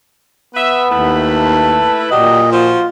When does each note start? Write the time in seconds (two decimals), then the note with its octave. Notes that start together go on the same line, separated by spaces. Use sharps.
0.55 B3 B4 E5
0.90 D#2 A3 E4 B4
1.36 A5
2.11 A#2 F#3 G4 D5 D#5
2.52 F3 F4 F#4 C5